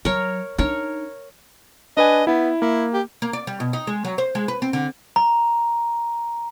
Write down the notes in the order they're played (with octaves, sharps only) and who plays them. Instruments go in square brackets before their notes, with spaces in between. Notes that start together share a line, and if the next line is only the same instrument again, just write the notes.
[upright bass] F#3 [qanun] A#4 C#5
[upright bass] D4 D#4 [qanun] A#4 C#5
[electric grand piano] D4 B4 G#5 [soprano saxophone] D#5
[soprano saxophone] B3 [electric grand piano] E4
[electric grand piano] A#3 [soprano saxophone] E4
[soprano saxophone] G4
[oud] A#3
D5
G3
B2
D#4
G#3
F#3
C5
G#3
B4
C4
D3
[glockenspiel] A#5